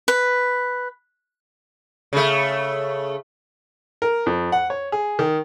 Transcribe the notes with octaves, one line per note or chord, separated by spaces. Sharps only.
B4
C#3 A3
A#4
F2
F#5
C#5
G#4
D#3